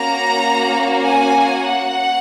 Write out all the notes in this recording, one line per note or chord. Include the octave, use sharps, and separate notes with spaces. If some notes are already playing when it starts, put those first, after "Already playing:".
Already playing: A#3 C#4 F#4 A#5
G#5
F#5